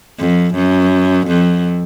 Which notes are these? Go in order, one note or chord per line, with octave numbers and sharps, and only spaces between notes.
F2
F#2
F2